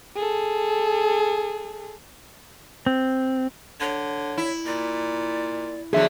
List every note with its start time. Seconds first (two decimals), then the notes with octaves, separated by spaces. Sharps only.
0.16 G#4 A4
2.86 C4
3.81 D3 C#5
4.38 E4
4.66 A#2 D5
5.93 D3 F#3 G#4 E5